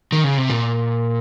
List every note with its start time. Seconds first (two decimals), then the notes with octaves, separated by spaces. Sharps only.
0.12 D#3
0.24 C#3
0.38 C3
0.50 A#2